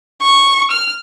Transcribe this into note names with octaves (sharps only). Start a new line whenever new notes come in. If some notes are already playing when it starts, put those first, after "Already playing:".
C#6
F6